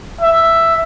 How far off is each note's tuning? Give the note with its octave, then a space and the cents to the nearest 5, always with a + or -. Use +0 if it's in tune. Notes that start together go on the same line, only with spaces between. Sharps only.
E5 +5